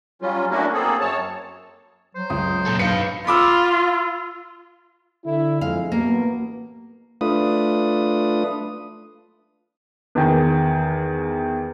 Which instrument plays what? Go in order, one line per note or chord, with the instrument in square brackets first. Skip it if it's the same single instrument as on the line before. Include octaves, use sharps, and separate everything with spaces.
[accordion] F#3 G3 C#4 F4
A3 A#3 C#4 D4 E4 F#4
A#3 C4 G#4 A4
F#2 C#5 A5
[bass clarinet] F#3 [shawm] C5
[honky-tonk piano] C#2 D#6
[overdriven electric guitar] A#2 A4
[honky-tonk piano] B1 C#7 [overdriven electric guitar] B4 F5
[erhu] F4 [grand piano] B5 D6 E6
[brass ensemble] D3 E4
[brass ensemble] F2 G#3 [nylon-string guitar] F5
[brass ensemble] A1 B2 [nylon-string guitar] A#3
[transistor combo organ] A3 D4 F4 B4 D#6
[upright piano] E2 D#3